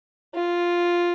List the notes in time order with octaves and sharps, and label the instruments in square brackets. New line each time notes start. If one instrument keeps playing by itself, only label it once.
[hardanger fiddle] F4